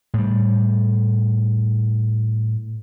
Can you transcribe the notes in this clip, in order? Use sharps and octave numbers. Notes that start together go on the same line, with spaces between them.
A2 G3